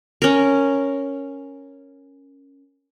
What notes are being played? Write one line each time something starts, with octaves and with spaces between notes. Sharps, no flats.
C#4 A#4